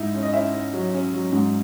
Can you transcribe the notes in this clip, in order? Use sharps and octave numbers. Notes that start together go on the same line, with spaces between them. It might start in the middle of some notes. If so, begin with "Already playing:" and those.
Already playing: G#2 D#4 E4
C#4
D#5
C#4 E4 E5
C#4
F#3
C#4
F#3
G#2